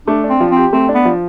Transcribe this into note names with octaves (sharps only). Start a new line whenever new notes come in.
A3 D4
D4
C4
F3
C4
G4
A3 C4
D4
B3
F3